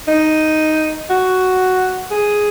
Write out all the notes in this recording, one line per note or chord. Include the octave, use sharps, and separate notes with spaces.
D#4
F#4
G#4